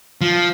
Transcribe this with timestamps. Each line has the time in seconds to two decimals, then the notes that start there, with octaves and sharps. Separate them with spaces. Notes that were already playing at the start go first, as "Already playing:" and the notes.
0.21 F3